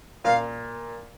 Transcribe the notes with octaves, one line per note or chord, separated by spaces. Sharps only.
A#2 F5